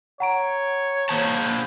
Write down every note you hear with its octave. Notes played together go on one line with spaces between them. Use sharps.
C#5 F#5 A#5 D7
A#3 C5 A5